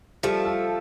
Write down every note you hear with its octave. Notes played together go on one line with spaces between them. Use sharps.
F3 G3 A3
A4